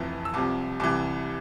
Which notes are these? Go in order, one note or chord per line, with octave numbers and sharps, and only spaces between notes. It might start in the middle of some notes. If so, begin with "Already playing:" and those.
Already playing: F1 F2 E3
E6
C2 C3 F3 D6
C2 C3 E3 D6